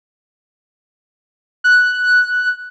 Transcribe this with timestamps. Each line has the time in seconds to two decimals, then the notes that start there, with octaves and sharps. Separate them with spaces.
1.64 F#6